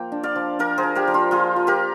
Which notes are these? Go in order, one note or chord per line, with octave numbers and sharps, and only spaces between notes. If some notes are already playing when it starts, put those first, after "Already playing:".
Already playing: F3 A#3 G5
D4
D5 F5
F3
F3 A#4 D5
G#4 C5
F3
G4 A#4
F3
F4
F3 F4 G#4
F3
G4 A#4